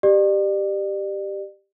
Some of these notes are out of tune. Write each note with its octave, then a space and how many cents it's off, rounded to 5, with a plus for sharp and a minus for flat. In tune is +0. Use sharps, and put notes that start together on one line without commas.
G4 +0 D5 +35